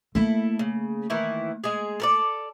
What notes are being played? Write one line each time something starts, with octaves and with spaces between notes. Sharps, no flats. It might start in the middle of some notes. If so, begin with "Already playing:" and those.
A3 A#3 E4 A4
C#3
D#3 E3 E4
G#3 G#4
A4 A#4 D5